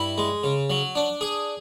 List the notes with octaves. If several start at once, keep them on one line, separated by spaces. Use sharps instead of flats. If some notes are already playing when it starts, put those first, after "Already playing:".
Already playing: G2 E4
G#3
C#3
F#3
D4
G#4